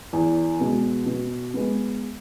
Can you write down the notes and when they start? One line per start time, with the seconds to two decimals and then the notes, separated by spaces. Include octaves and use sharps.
0.13 E2
0.60 B2 G#3 B3
1.06 B2
1.54 G#3 B3